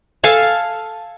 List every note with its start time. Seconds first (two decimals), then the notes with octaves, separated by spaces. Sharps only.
0.24 A4 F5 G#5 A5